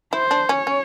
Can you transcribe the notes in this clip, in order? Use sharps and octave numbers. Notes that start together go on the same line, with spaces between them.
E4 C5
D4
C#4 C#5
C#4